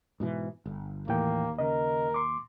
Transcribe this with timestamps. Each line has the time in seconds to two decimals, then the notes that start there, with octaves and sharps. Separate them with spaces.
0.20 G#2 B2 E3
0.66 G1
1.08 D#2 A2 E3 A#3 G5
1.58 C#3 A#4 D#5
2.14 C6 D6